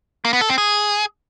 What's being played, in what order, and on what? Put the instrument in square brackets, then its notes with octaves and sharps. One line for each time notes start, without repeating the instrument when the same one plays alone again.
[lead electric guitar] A#3
B3
A4
C4
G#4